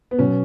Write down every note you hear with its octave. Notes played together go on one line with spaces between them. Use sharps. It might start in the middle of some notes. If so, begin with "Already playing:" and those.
B3
B2 F#3 C#4